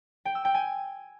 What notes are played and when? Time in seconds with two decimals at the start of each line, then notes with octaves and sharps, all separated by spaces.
0.25 G5
0.35 E6
0.45 G5
0.55 G#5